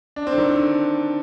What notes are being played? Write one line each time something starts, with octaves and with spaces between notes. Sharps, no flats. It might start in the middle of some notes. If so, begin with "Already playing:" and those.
D4
C4
D3
D#3
D3